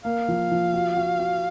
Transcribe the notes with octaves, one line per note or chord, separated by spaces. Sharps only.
A#3 F5
F3
F3
F#4
F#4
F#4